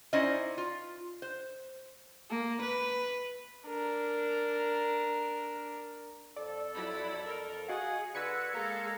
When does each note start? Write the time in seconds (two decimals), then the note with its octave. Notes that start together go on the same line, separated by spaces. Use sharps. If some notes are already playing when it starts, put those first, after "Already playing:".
0.13 C#4 D#4 E4 C5 D5 D#5
0.58 F4
1.22 C5
2.30 A#3
2.62 B4
3.66 D4 A#4
6.36 F2 A4 D5
6.74 F#3 E4 B5
7.26 A#4
7.68 F#4 G#4 D#5 F5 F#5 G#5
8.15 D3 F#4 B4 E6 G#6 C#7
8.53 G#3 A#3 A4 F5 A#5